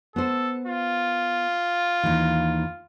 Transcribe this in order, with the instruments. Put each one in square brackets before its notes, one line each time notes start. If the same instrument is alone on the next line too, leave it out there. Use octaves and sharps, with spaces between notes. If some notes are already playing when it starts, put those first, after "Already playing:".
[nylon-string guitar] B3 C5 [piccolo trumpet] A4
[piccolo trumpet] F4
[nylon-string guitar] D#2 E3